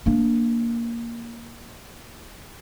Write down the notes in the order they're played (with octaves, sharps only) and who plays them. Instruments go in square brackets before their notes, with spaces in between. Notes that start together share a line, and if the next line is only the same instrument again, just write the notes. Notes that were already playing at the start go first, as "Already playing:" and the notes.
[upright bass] A#3 D4